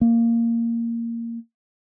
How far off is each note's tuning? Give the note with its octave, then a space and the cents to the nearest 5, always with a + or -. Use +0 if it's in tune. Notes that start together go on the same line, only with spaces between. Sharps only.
A#3 -10